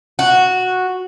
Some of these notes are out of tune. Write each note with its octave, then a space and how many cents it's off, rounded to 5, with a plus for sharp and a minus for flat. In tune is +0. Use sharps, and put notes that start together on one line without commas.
F#4 -5